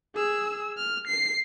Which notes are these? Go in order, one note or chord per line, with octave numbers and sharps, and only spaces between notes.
G#4 E6
F6
C7